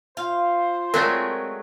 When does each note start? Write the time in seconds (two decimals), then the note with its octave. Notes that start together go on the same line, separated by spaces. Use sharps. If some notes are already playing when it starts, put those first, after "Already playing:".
0.17 F4 C5 F5 C6
0.94 F#3 G#3 A3 C4 A#4 D5